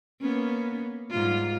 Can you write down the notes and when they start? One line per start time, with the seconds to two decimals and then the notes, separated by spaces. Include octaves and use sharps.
0.21 A#3 B3 C#4
1.10 G#2 G3 F4